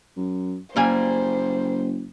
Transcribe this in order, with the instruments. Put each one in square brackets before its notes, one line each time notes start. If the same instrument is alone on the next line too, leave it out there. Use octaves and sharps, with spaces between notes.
[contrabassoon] F#2
[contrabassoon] F#1 [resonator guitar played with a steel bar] G3 A#3 G#5 [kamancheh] C5